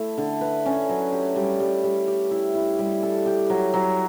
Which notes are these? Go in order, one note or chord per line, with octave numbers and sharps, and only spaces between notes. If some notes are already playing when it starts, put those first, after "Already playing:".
Already playing: A3 E4
D3
B4
C#4
F#3
G4
G3
G3
G3
G4
E4
E4
G3
A4
G4
F#3
F#3